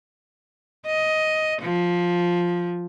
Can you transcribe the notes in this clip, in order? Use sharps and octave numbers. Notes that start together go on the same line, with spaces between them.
D#5
F3